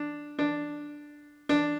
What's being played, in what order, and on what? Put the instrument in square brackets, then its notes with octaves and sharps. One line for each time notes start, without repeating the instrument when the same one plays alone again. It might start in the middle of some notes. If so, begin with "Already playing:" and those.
Already playing: [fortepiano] D4
D4
D4